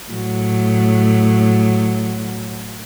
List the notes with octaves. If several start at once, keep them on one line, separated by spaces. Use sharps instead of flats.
A2 F#3